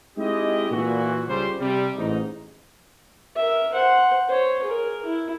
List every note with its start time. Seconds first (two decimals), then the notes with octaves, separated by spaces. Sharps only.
0.18 G#3 C4 D#4 E4 G4 D#5
0.70 A#2 E3 F#4
1.27 C#2 C#3 G3 C5
1.59 C3 G3
1.96 A1 G#2 D#4
3.36 A#4 E5
3.74 C5 F#5
4.28 C5 C#5
4.64 G#4 A#4
5.06 E4